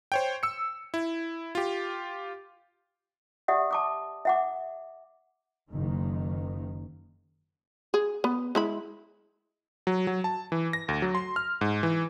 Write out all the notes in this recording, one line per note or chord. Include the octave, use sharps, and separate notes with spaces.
C5 C#5 G5
E6 C#7
E4
F4 G4
G4 D5 E5 F#5 D#6
A5 D6 D#6
E5 F#5 D6
F#1 D#3
G#4
B3
G#3 E4 B5
F#3
F#3
A5
E3
A#6
D2
F#3
C6
F6
G#2
E3